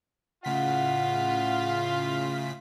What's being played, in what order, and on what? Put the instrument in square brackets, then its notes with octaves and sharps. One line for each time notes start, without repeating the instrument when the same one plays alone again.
[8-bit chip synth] A2 C#3 B6 [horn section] F4 [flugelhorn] F#5